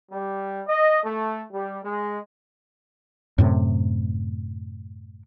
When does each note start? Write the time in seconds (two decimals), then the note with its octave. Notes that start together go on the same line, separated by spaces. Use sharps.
0.11 G3
0.68 D#5
1.03 A3
1.53 G3
1.83 G#3
3.38 F#2 A2 C3